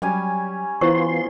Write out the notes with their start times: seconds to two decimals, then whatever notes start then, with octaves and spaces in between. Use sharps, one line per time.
0.02 F#3 G3 C#4 G#5
0.81 E3 B3 E4 F4 C5 C6 C#6